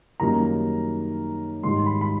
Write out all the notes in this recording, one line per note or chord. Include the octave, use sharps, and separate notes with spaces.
F#2 D#3 G3 A#3 D#4 A#5
G#2 D#3 G3 C6
B5
B5